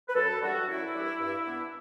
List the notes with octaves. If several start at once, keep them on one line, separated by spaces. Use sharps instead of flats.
B4
F#2 A4
E3 G3 D4 F#4
F#2 E4
E3 G3 D4
G2
E3 B3 D4